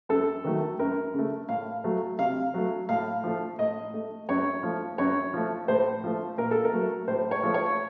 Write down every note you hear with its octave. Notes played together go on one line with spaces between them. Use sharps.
F#2 A4
D#3 F#3 A3
F#2 A#4
C#3 A3
A2 F5
F#3 A3
C3 F5
F#3 A3
A2 F5
F3 A3
A2 D#5
A3
F#2 C#5
F3 A3
F#2 C#5
F3 A3
A2 C5
F3 A3
A#2 A#4
A4
A#4
F#3 A3
A2 C5
C#5
F3 A3
C#5